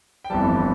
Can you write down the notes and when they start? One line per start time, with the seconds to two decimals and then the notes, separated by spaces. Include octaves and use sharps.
0.24 G5
0.30 G1 F2 E3 G3 A5